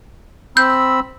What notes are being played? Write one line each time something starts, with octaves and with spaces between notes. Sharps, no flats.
C4 B5 E6 G6